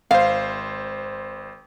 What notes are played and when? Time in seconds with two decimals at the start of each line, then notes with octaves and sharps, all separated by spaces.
0.11 G#1 C5 F5